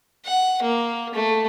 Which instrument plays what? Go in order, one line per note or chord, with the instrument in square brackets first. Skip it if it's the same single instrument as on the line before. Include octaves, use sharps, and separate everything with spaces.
[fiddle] F#5
A#3
A3